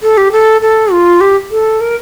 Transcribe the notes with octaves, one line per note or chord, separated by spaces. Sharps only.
A4
G4
A4
A4
F4
G4
A4
A#4